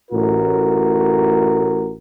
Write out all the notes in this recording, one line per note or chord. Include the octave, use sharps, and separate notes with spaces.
A1 A2 F#4 A#4